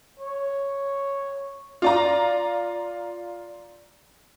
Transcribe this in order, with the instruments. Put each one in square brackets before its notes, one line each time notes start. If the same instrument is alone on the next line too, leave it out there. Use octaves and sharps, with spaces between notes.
[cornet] C#5
[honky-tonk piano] F4 D5 A#5